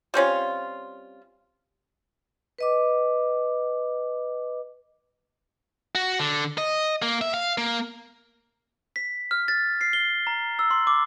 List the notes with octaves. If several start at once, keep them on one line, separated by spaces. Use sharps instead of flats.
G3 C4 C#4 F4
B4 D#5 D6
F#4
D3
D#5
A#3
E5
F5
A#3
B6
F6
A6
C7
G7
A#5
E6
C6
D6